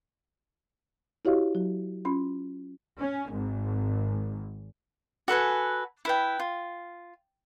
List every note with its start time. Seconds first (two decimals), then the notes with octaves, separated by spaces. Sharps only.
1.25 E4 F#4 G4 C#5 D#5 F5
1.55 F#3
2.05 C#4 F4 B5 C6
2.99 C#4
3.30 G#1
5.28 F#4 A4 B4 G#5
6.05 E4 B4 G5
6.40 F4